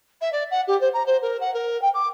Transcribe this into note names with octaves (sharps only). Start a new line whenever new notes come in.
E5
D5
F#5
G4
C5
A#5
C5
A#4
F#5
A#4
G5
D6